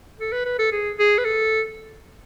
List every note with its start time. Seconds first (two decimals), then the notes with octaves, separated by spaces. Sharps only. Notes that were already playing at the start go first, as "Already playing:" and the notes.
0.20 A4
0.32 B4
0.45 B4
0.59 A4
0.72 G#4
0.99 G#4
1.18 B4
1.25 A4